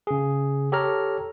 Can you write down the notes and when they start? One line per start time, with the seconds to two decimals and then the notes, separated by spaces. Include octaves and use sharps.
0.07 C#3 G#4
0.72 G4 A4 C#5 A#5 F6